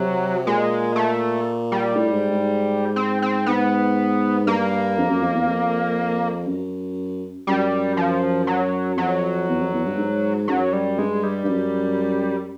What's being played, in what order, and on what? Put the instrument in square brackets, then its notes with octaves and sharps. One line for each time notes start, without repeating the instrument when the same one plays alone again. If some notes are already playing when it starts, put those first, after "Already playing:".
Already playing: [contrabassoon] C3 [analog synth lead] F#3
[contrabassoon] A#2 [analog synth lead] G#3
[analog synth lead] A3
G3
[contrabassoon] A2
G#2
G#2
[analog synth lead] C4
C4
[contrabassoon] G#2 [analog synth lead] B3
[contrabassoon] G2 [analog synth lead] A#3
[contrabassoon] F2
F#2
F2
E2
F2
F#2
[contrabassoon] F#2 [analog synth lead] G3
[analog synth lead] F3
F#3
[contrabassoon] F2 [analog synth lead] F#3
[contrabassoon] E2
F2
E2
G2
G#2
[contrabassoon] F#2 [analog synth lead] F#3
[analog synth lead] G3
[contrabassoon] G2 [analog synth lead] G#3
[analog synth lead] G3
[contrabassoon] G2
F#2